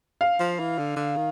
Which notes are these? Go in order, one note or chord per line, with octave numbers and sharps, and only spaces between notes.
F5
F3
E3
D3
D3
D#3